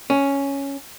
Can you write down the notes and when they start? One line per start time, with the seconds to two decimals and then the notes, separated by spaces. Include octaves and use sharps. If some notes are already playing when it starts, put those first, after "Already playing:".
0.10 C#4